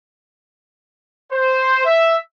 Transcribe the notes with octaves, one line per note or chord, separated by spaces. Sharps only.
C5
E5